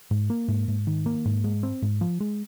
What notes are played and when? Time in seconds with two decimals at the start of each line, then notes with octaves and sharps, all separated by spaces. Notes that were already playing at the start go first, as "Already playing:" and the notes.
0.11 G#2
0.30 A#3
0.48 G#2
0.68 G#2
0.87 D#3
1.06 A#3
1.25 G#2
1.44 G#3
1.63 C4
1.82 G#2
2.01 F3
2.20 G#3